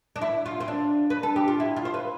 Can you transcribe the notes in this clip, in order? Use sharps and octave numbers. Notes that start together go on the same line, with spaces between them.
D4
E4
F4
C4
D4
B4
A4
G4
F4
E4
F4
C5
B4